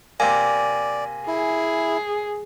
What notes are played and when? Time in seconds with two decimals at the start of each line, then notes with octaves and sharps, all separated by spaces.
0.20 C3 A#3 D5 G#5
1.27 E4 G#4